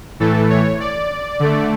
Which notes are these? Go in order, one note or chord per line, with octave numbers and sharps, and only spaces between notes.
A2 E3 A3 A4
C#5
D5
D3 A3